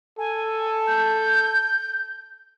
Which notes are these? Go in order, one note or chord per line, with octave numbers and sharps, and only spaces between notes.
A4 G#5
G6